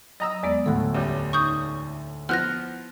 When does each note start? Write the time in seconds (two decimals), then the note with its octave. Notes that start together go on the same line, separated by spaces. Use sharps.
0.20 F#3 D#5 A#5 E6
0.43 E2 G#3 B3 D5
0.66 D2 A2 A4 F#5 F#6
0.94 C#2 G3
1.33 D#4 C#6 D#6 G6
2.29 F3 B3 E4 F#5 F6 F#6 A#6